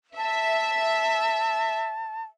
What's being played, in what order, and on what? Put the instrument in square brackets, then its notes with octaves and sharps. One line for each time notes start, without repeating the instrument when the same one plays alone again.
[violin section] E5 [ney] A5